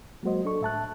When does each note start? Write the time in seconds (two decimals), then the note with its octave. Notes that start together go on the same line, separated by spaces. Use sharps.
0.23 F#3 G#3 A#3 F#4 C5 D#5
0.45 D4 A4 C#6
0.61 A2 E5 A5 F#6